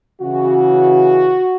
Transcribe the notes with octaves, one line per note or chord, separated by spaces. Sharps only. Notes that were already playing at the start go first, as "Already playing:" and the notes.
C#3 E3 F#4